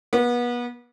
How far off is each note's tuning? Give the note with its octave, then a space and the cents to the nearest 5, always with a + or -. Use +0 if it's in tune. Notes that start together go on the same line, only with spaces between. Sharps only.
B3 -30